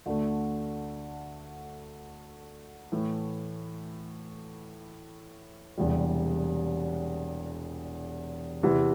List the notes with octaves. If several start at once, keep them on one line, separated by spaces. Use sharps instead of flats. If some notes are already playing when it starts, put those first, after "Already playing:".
D2 D3 A3
A2 E3 A3
E1 E2 C3 G3
E2 C3 E3